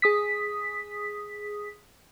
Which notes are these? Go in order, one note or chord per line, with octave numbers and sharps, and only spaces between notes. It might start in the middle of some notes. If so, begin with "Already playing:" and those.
G#4 D#6 B6